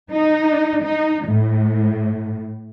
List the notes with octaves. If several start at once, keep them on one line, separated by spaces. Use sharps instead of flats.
D#4
D#4
A2